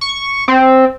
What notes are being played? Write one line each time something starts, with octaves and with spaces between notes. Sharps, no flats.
C#6
C4